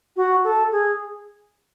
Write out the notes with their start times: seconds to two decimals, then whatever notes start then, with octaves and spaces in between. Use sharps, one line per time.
0.16 F#4
0.44 A4
0.72 G#4